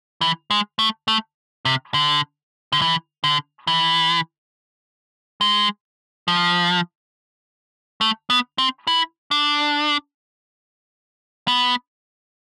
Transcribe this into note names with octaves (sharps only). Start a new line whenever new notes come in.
E3
G#3
A3
A3
C3
D3
D3
E3
D3
E3
G#3
F3
A3
B3
C4
E4
D4
B3